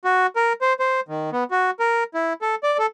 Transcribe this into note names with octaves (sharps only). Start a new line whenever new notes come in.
F#4
A#4
C5
C5
D#3
B3
F#4
A#4
E4
A4
D5
A4